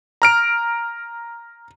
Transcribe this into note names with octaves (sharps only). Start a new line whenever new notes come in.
A#5 F6 D7